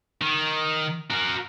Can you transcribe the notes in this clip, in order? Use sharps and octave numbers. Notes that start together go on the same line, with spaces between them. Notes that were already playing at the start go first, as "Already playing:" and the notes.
D#3
F#4 A#4